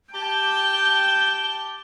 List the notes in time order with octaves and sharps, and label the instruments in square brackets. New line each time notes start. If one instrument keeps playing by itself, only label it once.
[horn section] G4 A5 [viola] G5 [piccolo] G7